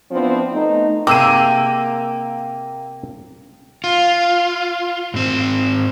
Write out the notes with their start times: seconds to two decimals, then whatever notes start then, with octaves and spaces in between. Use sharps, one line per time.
0.11 F3 B3 C4 D4 E4
0.52 A3 B3 D#4
1.07 C3 A#3 G4 G#4 G5 D6 E6 D#7
3.84 F4
5.14 G#2 C4